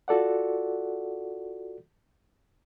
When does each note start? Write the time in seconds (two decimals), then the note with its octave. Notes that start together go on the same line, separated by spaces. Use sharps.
0.08 F4 F#4 A4 D5 F#5